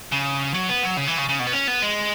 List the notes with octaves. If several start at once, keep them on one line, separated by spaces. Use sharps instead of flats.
C#3
F#3
B3
F#3
C#3
E3
C#3
C#3
B2
B3
C#4
B3
G#3